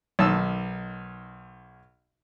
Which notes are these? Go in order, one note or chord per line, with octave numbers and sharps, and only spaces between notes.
B1 D#3 A5 E6